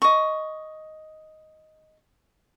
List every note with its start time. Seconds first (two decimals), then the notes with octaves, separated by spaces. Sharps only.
0.02 D#5 C#6